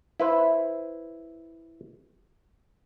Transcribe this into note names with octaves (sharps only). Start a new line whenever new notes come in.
E4 B4 C5